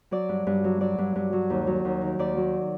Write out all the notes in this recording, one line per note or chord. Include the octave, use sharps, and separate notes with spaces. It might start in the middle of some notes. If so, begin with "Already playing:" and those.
F#3 D5
G2
G2
F#3
F#3 D5
G2
G2
F#3
D#2
F#3
D#2
D#3
D#2 D5
F#3